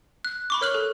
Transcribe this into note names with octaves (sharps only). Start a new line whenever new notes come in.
F#6
B5 C#6 D6
A#4 C#5 F6 F#6 F#7
A4